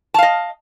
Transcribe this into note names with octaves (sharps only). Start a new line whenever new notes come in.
D#5 F5 A5